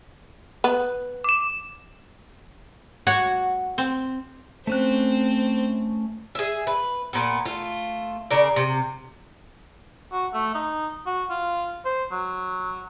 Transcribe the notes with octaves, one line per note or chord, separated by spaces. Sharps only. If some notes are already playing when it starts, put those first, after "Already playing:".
B3
D6 E7
F#4 C#5
C4
A3 C4 C#4 C5 F#6
G#4 E5
B4
A#2 B3
A3 F4
C#3 A#4 D5
C3
F#4
A3
D#4
F#4
F4
C5
F#3